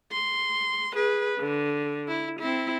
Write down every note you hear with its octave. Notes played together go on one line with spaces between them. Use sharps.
C6
G#4 B4
D3
E4
C4 E4